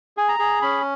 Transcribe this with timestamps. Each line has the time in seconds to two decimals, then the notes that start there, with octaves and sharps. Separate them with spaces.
0.17 G#4 G#5
0.28 A#5
0.39 G#4
0.62 C#4 B5